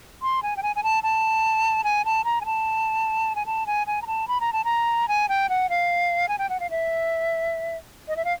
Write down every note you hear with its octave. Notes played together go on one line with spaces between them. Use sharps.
C6
G#5
G5
G#5
G#5
A5
A5
G#5
A5
A#5
G#5
A5
G#5
A5
G#5
G#5
A#5
A5
B5
A#5
A5
A#5
G#5
G5
F#5
F5
G#5
G5
F#5
F5
E5
D#5
E5
F5